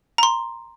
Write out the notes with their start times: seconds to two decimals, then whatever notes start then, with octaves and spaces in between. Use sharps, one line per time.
0.18 A#5
0.23 C6